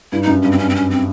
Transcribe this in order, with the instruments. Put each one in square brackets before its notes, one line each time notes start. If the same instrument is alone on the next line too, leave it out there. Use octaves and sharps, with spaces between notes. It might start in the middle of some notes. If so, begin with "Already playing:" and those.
[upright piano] G2 [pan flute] E4
[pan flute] D#4
[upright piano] F#2
[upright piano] G2 [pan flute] C#4
[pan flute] C4
C#4
C4
C#4
C4